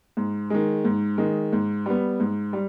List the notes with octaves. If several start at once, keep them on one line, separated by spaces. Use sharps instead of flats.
G#2
D#3 G#3
G#2
D#3 G#3
G#2
G3 B3
G#2
G3